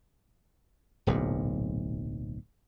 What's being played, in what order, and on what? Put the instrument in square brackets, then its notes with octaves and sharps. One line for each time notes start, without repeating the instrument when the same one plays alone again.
[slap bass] D1 B1 A#2